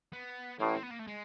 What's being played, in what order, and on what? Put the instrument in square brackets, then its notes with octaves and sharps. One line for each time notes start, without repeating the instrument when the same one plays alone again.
[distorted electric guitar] B3
[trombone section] A1 A2 [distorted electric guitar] A#3
[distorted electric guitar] C4
B3
A#3
A3
G#3